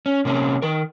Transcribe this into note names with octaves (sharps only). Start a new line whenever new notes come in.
C#4
C3 A#3 C#4
D#3 A#4